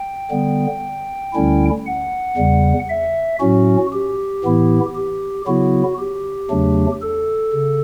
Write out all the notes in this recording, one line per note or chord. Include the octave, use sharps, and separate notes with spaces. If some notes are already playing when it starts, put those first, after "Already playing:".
Already playing: G5
D3 G3 B3
D2 D3 G3 C#4 E4
F#5
E2 C#3 G3
E5
A2 F#3 C#4 F#4
G4
A2 E3 B3 E4
G4
C#3 F#3 B3 E4 F#4
G4
E2 C#3 F#3 A3 D4
A4
C#3